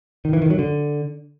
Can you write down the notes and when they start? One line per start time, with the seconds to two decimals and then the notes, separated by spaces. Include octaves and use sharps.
0.25 D#3
0.33 E3
0.42 D#3
0.50 F#3
0.59 D3